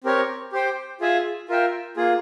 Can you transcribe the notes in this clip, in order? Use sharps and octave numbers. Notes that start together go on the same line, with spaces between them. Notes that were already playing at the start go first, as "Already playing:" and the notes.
C4 G4 A#4 C#5
G4 C5 G5
F4 G#4 E5 G#5
F4 A#4 E5 G5
A#3 F4 G#4